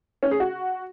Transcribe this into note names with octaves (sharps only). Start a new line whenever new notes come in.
C#4
G#4
F#4